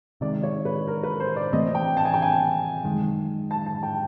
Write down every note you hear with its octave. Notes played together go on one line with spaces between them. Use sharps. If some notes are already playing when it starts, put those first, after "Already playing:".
C3 D#3 G#3 D5
C#5
B4
A#4
B4
C5
D5
C3 E3 A3 C4 D#5
G5
A5
G#5
G5
G#5
F#2 D#3 G#3
A5
A5
G5